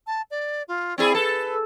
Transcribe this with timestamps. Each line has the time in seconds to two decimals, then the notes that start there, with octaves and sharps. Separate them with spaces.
0.07 A5
0.31 D5
0.68 F4
0.98 C4 E4 G#4 D5
1.14 A4 B4